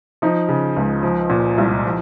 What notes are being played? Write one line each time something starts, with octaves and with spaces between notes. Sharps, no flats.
F3 D#4
C#3
C#2
F3
A#2
C2
F3